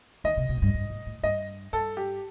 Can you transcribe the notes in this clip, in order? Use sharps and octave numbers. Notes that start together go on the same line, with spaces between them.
D#3 D#5
C3
B2
F#2
G2
G2
A2
A2
G2 D#5
G2 A4
G4